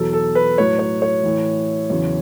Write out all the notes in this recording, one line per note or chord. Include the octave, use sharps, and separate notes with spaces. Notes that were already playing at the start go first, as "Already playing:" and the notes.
Already playing: E2 B2 F#3 A4
A4
B4
A2 F#3 C#5
C#5
C#5
A2 E3
E2 C#3 F#3